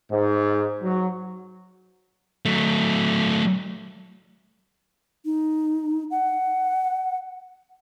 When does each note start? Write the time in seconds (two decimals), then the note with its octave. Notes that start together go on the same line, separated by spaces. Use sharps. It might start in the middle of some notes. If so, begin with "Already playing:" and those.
0.11 G#2
0.83 F#3
2.45 F#3 A3
5.25 D#4
6.11 F#5